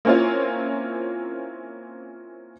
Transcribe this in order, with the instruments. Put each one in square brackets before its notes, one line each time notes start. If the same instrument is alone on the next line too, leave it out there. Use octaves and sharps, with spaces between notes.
[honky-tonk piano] A#3 C4 C#4 E4 F4